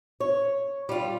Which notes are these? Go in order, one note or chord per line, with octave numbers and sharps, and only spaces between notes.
C#5
G3 F4